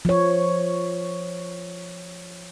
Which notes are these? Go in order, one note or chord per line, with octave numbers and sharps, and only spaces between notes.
F3 C#5